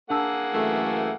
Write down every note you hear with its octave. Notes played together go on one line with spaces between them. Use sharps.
A#3 D4 G#4 F#5 A5 E6
F#2 E3 A3